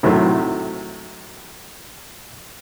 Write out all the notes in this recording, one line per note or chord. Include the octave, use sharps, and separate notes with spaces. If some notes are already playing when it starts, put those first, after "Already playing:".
A2 C3 D#3 F#3 A3